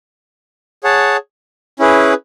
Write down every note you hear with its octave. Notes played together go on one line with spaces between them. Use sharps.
G#4 C#5 F#5 A5
C#4 E4 G#4 B4